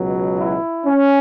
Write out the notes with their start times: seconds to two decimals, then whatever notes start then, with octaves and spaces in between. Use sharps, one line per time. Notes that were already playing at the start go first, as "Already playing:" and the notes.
Already playing: C#2 B2 F#3
0.39 E4
0.85 C#4